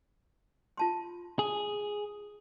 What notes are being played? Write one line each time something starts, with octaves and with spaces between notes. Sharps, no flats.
F4 A5 C6
G#4